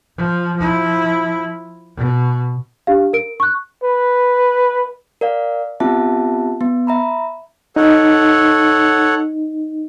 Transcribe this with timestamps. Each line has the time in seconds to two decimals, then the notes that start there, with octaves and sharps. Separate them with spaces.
0.17 F3
0.57 F3 E4
1.97 B2
2.87 D4 G4 F5
3.13 A#4 D7
3.40 C#6 F#6
3.84 B4
5.21 A#4 D5 F5
5.80 B3 C4 F4 G4 E5 A5
6.61 B3
6.87 E5 A#5 B5
7.76 D#4 A4 C#5 F#5